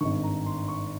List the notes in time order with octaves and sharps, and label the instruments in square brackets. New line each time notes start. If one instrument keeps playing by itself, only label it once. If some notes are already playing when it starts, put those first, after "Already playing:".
[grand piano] G#1 G2 D#3 C#6
A#5
C6
C#6